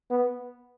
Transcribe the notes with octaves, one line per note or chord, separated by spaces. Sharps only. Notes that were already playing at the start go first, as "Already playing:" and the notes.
B3